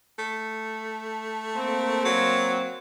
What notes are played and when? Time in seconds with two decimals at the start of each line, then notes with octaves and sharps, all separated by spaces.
0.19 A3
1.56 A#3 C4
2.05 F#3